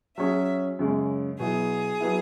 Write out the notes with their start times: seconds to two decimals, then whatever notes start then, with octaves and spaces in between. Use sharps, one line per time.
0.17 F#3 C#4 G#4 E5
0.79 F#2 C#3 G#3
1.39 B2 F#3 E4 G#4
2.01 F#3 B3 E4